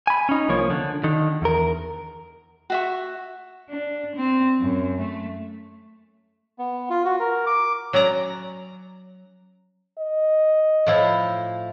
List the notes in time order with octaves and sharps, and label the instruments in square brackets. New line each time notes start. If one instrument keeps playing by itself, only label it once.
[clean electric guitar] G#5 B5
C#4 D#4
C2 F3 A#3 C#5
D3
D3 D#3
E2 A#4
[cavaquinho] F#4 E5 C#6
[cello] D4
C4
F#2
A3
[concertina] B3
F4
F#4
A#4
D6
[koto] F#3 C#4 D5 A#5
[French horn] D#5
[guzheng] A2 F3 E4